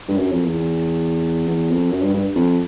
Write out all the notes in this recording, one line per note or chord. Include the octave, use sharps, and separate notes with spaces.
G2
F#2
F2
E2
E2
F2
F#2
G2
G2
F2